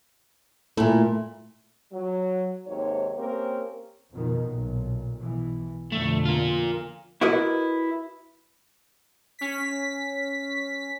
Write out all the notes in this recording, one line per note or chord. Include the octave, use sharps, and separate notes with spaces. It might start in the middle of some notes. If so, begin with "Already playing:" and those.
A#2 A3 E4
F#3
D#2 G#2 C3 C#5
A#3 C4 C#4 G4 A#4
F2 B2 D#3
B1 A#2
B2 E3
F2 B2 D3 A3
F4 A#4
E4 F#4 A#4 B4 D#5
C#4 B6